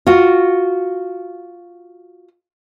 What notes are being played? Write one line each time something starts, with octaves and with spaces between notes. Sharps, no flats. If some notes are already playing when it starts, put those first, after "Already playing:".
F4 F#4